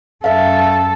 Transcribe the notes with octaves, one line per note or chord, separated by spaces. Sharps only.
F#2 A4 E5 F5